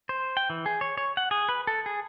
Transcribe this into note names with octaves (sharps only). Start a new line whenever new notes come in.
C5
G5
E3
G#4
C#5
C#5
F#5
G#4
B4
A4
G#4